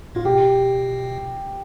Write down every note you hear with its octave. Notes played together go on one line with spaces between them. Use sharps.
A2 F4
B2 G4